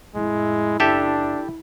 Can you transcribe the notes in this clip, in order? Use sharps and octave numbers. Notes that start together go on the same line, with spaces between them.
F2 A2 G#3 E4
F#1 D4 G4 A4 E5